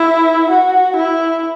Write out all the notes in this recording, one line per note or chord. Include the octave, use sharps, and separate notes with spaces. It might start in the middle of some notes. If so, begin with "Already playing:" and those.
Already playing: E4
F#4
E4